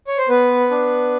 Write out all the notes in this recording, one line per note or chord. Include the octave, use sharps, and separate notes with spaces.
C#5
C5
B3 B4
D4